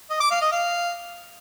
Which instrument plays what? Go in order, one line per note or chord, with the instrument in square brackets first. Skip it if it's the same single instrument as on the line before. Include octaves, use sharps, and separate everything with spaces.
[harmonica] D#5
D6
F5
D#5
F5